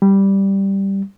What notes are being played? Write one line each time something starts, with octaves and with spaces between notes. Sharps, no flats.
G3